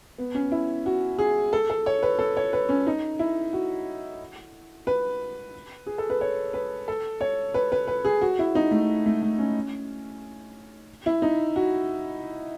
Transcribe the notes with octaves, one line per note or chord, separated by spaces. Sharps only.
B3
C#4
E4
F#4
G#4
A4
A4
C#5
B4
A4
C#5
B4
C#4
D#4
E4
F#4
B4
G#4
A4
B4
C#5
B4
A4
C#5
B4
B4
B4
G#4
F#4
E4
D#4
A3
A3
A3
C#4
E4
D#4
F#4